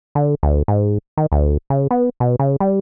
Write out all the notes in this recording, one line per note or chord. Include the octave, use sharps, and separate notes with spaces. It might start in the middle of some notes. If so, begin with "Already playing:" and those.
D3
D2
G#2
D#3
D2
C#3
B3
B2
C#3
G3